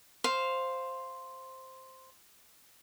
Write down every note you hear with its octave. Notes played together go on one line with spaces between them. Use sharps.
C5 F5